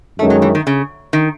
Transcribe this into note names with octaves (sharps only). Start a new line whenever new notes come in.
F#2 D#3 G#3 A3 C#4
F#3
E3
D#3
C#3
D#3